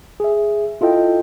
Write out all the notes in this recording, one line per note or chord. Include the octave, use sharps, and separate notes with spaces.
G#4 E5
E4 F4 A4 D#5 G5